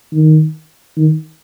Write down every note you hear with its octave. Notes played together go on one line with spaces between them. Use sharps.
D#3
D#3